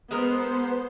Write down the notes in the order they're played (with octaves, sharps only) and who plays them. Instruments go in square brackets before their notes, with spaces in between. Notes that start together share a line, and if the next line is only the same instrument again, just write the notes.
[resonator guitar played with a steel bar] G#3 G#4 A#4 [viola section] B3 C5